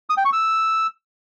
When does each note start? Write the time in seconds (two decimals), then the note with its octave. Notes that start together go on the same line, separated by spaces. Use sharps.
0.10 D#6
0.17 G5
0.25 C#6
0.33 E6